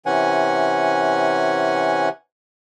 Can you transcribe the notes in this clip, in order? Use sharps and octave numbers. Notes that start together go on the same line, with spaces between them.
C3 E3 C#4 F#5 G#5